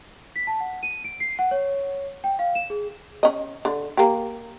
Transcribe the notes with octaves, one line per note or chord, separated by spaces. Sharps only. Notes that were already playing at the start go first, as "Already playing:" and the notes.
B6
A5
F#5
D#7
D7
C7
F#5
C#5
G5
F5
E7
G#4
C#4 D#5
D3
A#3 G4